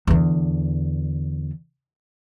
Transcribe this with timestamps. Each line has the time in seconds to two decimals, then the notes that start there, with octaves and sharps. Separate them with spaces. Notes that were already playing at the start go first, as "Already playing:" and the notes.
0.07 E2 D3